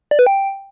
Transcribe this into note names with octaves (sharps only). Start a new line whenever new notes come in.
D5
B4
G5